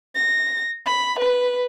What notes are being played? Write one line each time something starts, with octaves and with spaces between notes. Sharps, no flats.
A#6
B5
B4